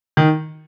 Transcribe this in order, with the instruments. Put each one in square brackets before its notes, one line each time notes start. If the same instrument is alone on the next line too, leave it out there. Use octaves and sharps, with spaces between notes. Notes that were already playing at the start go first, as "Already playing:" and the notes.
[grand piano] D#3